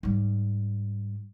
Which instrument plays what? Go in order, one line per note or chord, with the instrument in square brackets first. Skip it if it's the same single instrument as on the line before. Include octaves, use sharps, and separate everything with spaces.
[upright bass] G#2 G3